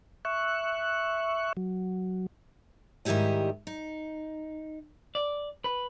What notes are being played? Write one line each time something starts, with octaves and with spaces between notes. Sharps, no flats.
E5 C#6 F#6
F#3
G#2 D#3 G3 E4 G4 D#5
D#4
D5
B4